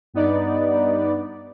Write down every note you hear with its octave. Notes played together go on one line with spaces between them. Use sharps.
G2 B3 D#4 D5